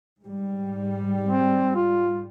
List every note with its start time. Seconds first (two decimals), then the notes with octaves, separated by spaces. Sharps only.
0.21 G#2 G3
1.28 C4
1.75 F4